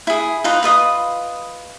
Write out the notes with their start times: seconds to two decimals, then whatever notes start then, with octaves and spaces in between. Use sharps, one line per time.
0.07 E4 G#4
0.44 D#4 F4 B4 D#5
0.63 F4 B4 D#5 D#6